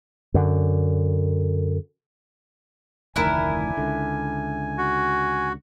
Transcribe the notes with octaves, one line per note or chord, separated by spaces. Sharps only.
F#2 D3
F1 D2 D#3 D4 E4 A#4 G#5
C#2 D3
F#4